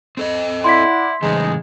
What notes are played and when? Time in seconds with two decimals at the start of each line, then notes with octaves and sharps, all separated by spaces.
0.17 C4 A4 D#5
0.64 E4 D5 F#5 C6 B6
1.22 A2 C#3 E3 G#3 D#4